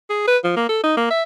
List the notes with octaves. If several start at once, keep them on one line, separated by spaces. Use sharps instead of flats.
G#4
B4
F3
A#3
A4
D#4
A#3
E5